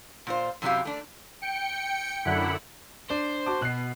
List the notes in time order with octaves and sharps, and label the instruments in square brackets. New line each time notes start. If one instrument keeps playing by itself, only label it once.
[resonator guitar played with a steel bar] A#2 F4 C5
F#2 C3 F#3 E4 G4 F5
A3 D4
[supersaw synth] G5 C#7
F#2 D3 E4 F#5 B5
[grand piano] D4 [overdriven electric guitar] C5
[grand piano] F#4 A5 D6
[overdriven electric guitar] B2 [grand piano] F#6 C7